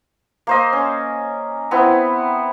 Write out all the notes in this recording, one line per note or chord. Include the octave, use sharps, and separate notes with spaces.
A#3 C5 D#5
C#4
B3 C4 E4